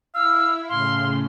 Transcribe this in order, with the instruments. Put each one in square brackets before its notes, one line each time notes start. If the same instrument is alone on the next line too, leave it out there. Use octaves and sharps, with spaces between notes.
[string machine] E4 [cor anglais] F5 [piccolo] E6
[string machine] A2 C#3 [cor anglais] F5 [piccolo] C6